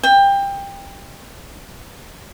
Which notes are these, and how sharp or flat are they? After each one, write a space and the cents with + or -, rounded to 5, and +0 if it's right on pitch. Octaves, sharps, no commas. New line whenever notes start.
G5 +20